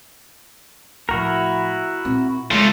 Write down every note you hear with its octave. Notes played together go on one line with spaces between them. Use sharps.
A2 F3 E4 F#4 A#4
A#2 C4
C#3 G#3 A3 F4